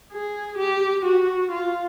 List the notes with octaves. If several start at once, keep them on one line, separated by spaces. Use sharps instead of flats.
G#4
G4
F#4
F4